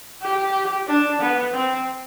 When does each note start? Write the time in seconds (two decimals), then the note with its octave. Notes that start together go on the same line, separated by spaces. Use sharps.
0.22 G4
0.88 D4
1.21 B3
1.53 C4